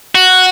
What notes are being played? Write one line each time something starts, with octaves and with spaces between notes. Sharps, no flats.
F#4